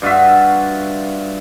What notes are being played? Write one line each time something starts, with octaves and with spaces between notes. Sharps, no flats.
G2 F4 F#4 E5